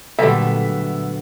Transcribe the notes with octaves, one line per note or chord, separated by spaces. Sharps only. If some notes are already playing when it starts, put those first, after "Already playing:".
A#2 D3 F#3 G3 A3 B3 E5